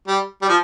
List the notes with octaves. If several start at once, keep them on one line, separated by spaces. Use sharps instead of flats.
G3
G3
F3